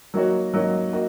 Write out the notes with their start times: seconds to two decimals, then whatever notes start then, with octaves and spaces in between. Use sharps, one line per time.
0.14 F#3 A#3 D#4 F#4 C#5
0.54 F#3 A#3 D#4 F#4 C#5
0.93 A#3 D#4 F#4